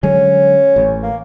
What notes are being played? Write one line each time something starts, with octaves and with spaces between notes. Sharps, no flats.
D3 F#3 G#3 C#4
A1
A#3